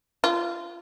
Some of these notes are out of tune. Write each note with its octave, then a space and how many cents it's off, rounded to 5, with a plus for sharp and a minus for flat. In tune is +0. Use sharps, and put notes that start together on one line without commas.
F4 -25